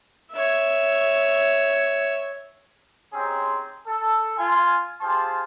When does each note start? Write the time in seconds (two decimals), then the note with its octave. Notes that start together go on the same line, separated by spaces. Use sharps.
0.33 C#5 E5
3.13 C4 C#4 D#4 G4 G#4 C5
3.87 A4
4.37 F4 G#5
5.01 F4 G4 G#4 C5 A5 C6